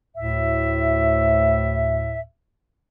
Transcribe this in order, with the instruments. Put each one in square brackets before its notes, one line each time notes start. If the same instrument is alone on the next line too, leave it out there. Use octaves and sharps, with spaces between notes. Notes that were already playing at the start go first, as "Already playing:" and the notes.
[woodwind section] D2 A2 E5